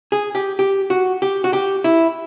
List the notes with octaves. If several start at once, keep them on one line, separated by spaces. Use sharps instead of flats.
G#4
G4
G4
F#4
G4
F#4
G4
E4